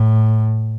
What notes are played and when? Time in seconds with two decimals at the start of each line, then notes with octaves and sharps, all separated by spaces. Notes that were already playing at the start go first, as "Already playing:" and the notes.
Already playing: A2